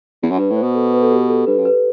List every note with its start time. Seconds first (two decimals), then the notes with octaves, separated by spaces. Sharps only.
0.23 E2
0.31 F#2
0.38 G2 B4
0.50 A2
0.56 C5
0.62 B2
0.75 A4
0.93 B4
1.03 A4
1.11 G4
1.29 A4
1.47 G2 B4
1.59 F#2
1.65 B4